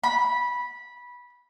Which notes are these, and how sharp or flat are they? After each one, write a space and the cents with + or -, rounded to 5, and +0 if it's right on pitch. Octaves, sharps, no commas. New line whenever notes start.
B5 -15